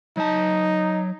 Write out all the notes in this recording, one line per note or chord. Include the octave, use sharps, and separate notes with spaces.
F#3 D#4 A5